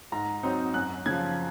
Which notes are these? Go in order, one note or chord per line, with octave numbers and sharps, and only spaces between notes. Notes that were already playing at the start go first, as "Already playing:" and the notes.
G#2 A#5
F#3 C4 D#4
F#2 F#6
C#3 F3 G#6